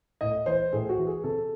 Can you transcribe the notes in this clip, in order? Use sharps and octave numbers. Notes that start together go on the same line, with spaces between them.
A2 D#5
E3 C5
A2 G#4
F#4
E3
G#4
C3 A4